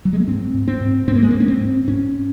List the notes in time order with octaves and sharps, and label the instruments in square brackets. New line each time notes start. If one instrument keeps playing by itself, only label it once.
[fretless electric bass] F#3
G#3
A#3
G#2 C4
G#2
C4
G#2
G#2 C4
A#3
G#3
G#2 A#3
C#4
C4
G#2
G#2 C#4